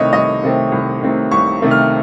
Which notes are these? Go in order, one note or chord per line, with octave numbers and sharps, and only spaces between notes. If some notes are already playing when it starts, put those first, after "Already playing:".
Already playing: C2 C3 D#3 A3 C4 C#5 D#5
C2 D#5
C3 D#3 A3 C4
C2
C3 D#3 A3 C4
C2 C#6
C3 D#3 A3 C4
F6